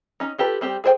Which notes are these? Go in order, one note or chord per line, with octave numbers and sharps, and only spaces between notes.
C#4 D#4
F4 G4 A4 B4
G3 C4 G4
G#4 A4 C5 C#5 G5